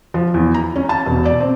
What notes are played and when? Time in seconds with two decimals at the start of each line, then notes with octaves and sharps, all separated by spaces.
0.14 F3
0.34 E2
0.54 A#5
0.76 C#4
0.89 A5
1.06 E1
1.26 D5
1.40 C4